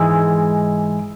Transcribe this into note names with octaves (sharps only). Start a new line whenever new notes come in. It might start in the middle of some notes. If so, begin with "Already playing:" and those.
Already playing: G#2 E3 G#3